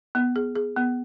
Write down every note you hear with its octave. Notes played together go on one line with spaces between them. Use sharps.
B3
G#4
G#4
B3